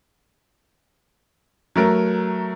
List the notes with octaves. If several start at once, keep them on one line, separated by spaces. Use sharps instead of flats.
F#3 A3 A#4